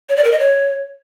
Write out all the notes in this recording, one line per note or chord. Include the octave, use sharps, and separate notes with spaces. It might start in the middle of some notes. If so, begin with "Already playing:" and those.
C#5
D5
A#4
D#5
C#5